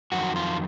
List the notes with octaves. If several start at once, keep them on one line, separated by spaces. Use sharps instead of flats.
F2 D#3 F#3 F#4
F4